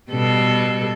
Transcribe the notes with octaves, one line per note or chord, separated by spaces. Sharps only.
B2 G3 A4